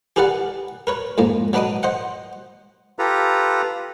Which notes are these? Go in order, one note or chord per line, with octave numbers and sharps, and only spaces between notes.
G4 G#4 A#4 B4 D5 F#5
A#4 B4 C#5
F2 G#2 A#3
F#3 D4 B4 D#5 D6 D#6
C5 D#5 F#5
F4 G4 A4 B4 A#5